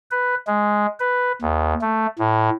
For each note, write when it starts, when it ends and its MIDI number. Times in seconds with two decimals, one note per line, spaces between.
0.11 0.35 71
0.47 0.86 56
1.00 1.32 71
1.42 1.74 39
1.81 2.07 57
2.19 2.50 45